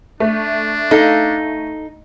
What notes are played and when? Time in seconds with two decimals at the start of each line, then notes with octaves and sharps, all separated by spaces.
0.20 A3 D4
0.91 D#4 A4 F5